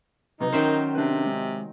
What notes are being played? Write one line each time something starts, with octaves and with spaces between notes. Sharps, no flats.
C#2 C3 F#3 D#4 B4
D#3 F#3 C#4 A#4 C5 E5 G5
C3 D4 B4
G#3